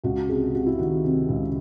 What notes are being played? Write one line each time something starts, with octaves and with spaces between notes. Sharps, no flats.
C#2 F#4
C3 G#4
C3 F#4
E4
D#3 F#4
C3
C#2